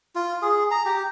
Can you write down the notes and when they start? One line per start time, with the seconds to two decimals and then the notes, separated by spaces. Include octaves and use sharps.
0.15 F4
0.42 G#4
0.71 A#5
0.85 G4